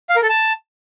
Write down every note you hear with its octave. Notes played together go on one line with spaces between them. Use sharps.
F5
A#4
A4
A5